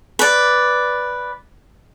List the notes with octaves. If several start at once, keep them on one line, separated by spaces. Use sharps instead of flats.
B4 D5